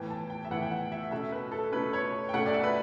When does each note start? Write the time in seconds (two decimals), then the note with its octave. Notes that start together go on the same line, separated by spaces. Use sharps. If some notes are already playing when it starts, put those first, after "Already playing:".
Already playing: A2 E3 B3 G5
0.10 A5
0.30 G5
0.45 E5
0.50 A2 E3 B3 F#5
0.62 G5
0.72 F#5
0.92 E5
1.11 B2 A3 C#4 E5
1.32 B4
1.52 A4
1.72 B2 A3 C#4 B4
1.93 C#5
2.29 G5
2.34 B2 A3 C#4 F#5
2.46 D5
2.54 E5
2.63 B4